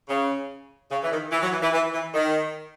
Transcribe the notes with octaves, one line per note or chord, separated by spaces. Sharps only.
C#3
C#3
E3
D#3
E3
F#3
E3
E3
E3
E3
D#3